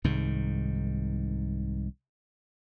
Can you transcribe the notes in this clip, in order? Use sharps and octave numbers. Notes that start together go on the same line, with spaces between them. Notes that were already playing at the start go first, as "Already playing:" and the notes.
C2 G#2 D#3